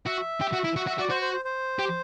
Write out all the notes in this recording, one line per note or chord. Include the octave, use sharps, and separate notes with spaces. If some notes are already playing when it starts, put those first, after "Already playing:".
F#4 E5
G4
F#4
E4
F#4
F#5
F#4 E5
F#4 D5
F#4 C5
C5
C5
C5
G4